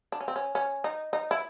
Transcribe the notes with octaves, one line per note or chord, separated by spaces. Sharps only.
D4
C#4
C4
C#4
C#4
D#4
D#4
E4